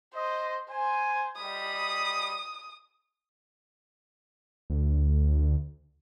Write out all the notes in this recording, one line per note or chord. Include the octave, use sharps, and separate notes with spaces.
C5 D#5
C5 G#5
G3 D#5 B5 D#6
D2